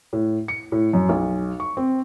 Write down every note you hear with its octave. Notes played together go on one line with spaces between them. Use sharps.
A2
C#7
A2
F#2
B1
C#6
C4